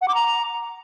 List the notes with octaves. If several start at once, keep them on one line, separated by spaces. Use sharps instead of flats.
F#5
D6
A#5